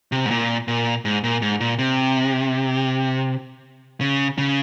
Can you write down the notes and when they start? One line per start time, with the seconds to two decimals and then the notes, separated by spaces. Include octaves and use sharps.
0.12 C3
0.26 G#2
0.31 A#2
0.68 A#2
1.05 G#2
1.24 A#2
1.42 G#2
1.60 A#2
1.79 C3
4.01 C#3
4.38 C#3